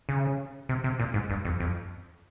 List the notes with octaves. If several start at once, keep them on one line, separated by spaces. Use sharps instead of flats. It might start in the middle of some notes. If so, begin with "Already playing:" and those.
C#3
C3
C3
A#2
G#2
G2
F2
F2